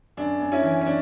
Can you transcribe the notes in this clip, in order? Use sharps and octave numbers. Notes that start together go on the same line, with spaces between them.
F#2 D4
F#2
C#4 E4
E3
C#4
D4